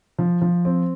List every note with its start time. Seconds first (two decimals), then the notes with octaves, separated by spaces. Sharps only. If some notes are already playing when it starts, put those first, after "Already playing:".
0.19 F3
0.42 F3
0.65 C4